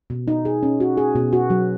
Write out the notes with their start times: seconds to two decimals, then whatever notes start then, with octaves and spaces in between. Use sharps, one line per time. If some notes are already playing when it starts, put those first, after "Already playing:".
0.10 B2
0.28 D#4
0.45 G#4
0.63 C#4
0.80 F#4
0.97 G#4
1.16 B2
1.33 F#4
1.50 F#3